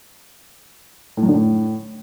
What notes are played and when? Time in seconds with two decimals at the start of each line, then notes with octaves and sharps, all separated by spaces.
1.17 A2
1.23 F#2
1.28 D3
1.34 A2